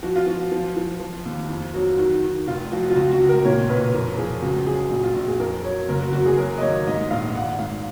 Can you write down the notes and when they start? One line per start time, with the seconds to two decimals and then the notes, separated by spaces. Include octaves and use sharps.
0.03 F3 F#4
0.16 F4
0.27 F3 F#4
0.52 F3
0.77 F3
1.00 F3
1.25 D#2
1.50 F2
1.74 F#3 F#4
1.98 D#3 F#4
2.23 D#3
2.47 F1 F4
2.72 F3 F#4
2.90 F4
2.95 C#2 F#4
3.12 F#4
3.20 C#2
3.29 A#4
3.45 A#2 C#5
3.68 B1 B4
3.93 F2 A#4
4.17 F3 G#4
4.42 C#2 F#4
4.66 F#3 G#4
4.90 A#1 F#4
5.03 F4
5.15 A#1 F#4
5.28 G#4
5.40 F2 A#4
5.64 F#3 C#5
5.89 F#1 A#4
6.00 F#4
6.13 F#1 F#4
6.26 G#4
6.37 F#3 A#4
6.58 D#5
6.61 D#2 C#5
6.87 G#2 D#5
7.11 A#1 F5
7.34 G#1 F#5
7.59 G#2 F5